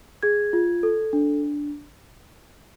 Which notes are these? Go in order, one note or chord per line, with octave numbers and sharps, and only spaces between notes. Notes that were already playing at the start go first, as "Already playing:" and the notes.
G#4 G#6
F4
A4
D4